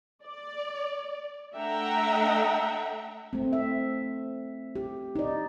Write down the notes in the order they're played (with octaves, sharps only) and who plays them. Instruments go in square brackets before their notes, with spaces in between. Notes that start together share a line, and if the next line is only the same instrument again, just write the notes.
[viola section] D5
A3 D4 E5 F#5 G5 A#5
[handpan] A3 C4
E5
G4
D#4 D5